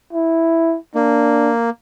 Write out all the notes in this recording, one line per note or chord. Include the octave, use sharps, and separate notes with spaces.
E4
A#3 D4